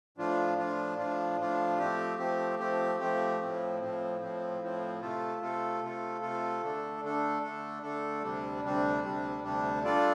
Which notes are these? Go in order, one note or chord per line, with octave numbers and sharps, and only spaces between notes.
A2 F3 D4 F4
A2 F3 D4 F4
A2 F3 D4 F4
A2 F3 D4 F4
F3 A3 C4 G4
F3 A3 C4 G4
F3 A3 C4 G4
F3 A3 C4 G4
A2 F3 C4
A2 F3 C4
A2 F3 C4
A2 F3 C4
C3 A3 F4 A4
C3 A3 F4 A4
C3 A3 F4 A4
C3 A3 F4 A4
D3 A3 D4 A4
D3 A3 D4 A4
D3 A3 D4 A4
D3 A3 D4 A4
D2 C3 G3 D4
D2 C3 G3 D4
D2 C3 G3 D4
D2 C3 G3 D4
G3 D4 F4 A4 D5